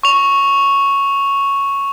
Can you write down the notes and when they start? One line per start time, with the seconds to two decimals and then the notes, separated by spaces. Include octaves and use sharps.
0.03 C#6 F7